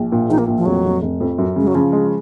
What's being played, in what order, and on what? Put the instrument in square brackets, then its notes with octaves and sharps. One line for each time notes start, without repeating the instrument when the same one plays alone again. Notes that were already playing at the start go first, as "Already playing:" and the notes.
Already playing: [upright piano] A#1
A#2
[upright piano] A#1 [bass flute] D#4
[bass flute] A#3
[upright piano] A#2
[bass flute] F3
[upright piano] F1 [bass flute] F#3
[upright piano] F1
F1
F2
F#2
[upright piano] C#3 [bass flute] G#3
[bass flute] F#3
[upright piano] C#3 [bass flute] F3
[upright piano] G#3